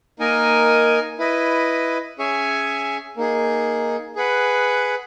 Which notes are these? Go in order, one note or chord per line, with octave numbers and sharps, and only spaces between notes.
A#3 D#4 A#4 D#5 G#5
E4 B4 D#5
C#4 G#4 C#5 E5 G#5
A#3 D#4 G#4
G#4 B4 F#5